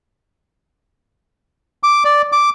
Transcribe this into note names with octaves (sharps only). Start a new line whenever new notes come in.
D6
D5
D6